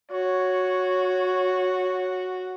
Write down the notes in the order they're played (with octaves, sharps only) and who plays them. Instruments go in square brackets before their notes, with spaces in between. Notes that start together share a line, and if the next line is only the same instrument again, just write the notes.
[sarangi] F#4 [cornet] C#5